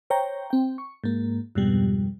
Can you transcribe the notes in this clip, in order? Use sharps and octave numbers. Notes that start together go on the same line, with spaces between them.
C5 C#5 G5 A#5
C4 G5
C#6
G#2 A#3
F2 G#2 B2 G3